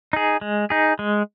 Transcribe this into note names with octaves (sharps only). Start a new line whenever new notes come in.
D#4 G#4
G#3
D#4 G#4
G#3